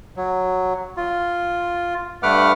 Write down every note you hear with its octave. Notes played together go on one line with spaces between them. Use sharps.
F#3
F4
G2 A3 B4 F#5 D6 F6